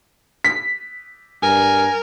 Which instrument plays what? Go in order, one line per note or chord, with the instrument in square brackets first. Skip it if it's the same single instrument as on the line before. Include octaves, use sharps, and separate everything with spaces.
[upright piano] B6
[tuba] G2 [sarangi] A#4 [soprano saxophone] G#5